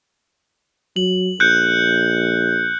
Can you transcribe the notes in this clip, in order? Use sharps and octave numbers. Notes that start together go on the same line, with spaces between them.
F#3 F#7
A#1 F#6 G6 C#7